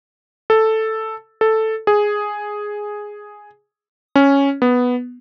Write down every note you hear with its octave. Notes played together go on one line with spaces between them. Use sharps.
A4
A4
G#4
C#4
B3